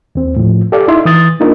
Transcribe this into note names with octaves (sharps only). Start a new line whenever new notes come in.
D#2 C4
A2 F3
G4 A4 D5 F5
D#4 E4 C6
E3 D#6 A6
A#3 D4 D#4 F4 A#4